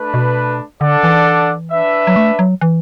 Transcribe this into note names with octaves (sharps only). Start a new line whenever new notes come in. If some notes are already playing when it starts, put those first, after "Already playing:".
Already playing: A3 D4 B4
B2
D3 D4 A4 D5 F#5
E3
D4 B4 E5
F#3
A3
F#3
E3